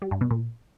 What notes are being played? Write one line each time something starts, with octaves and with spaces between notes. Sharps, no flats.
G3
G2
B2
A#2